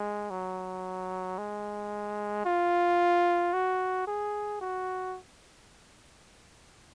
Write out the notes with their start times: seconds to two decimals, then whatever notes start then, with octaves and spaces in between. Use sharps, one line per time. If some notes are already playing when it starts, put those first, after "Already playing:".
Already playing: G#3
0.31 F#3
1.38 G#3
2.46 F4
3.54 F#4
4.08 G#4
4.61 F#4